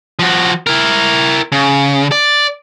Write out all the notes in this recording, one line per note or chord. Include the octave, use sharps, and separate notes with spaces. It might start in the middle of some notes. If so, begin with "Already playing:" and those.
F3 F#4
E4 A#4
C#3
D5